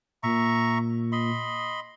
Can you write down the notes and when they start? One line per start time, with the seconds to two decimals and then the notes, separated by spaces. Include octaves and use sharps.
0.23 A#2 E5 A#5 C#6
1.12 D#5 B5 C6